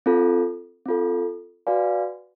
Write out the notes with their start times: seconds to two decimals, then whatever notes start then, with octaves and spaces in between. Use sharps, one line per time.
0.06 C4 F4 A4
0.86 C4 F4 A4
1.67 F#4 B4 D5 F5 G#5